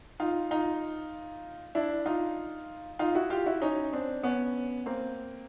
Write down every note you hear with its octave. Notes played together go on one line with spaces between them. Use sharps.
D#4 F4
D#4 F4
D4 E4
D#4 F4
D#4 F4
E4 F#4
F4 G4
E4 F#4
C#4 D#4
C4 D4
B3 C#4
A#3 C4